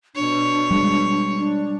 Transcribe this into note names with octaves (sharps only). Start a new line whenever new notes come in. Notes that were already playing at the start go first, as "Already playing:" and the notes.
B2 D4 C#5
G3 G#3
D4